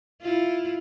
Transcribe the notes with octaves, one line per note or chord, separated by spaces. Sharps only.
E4 F4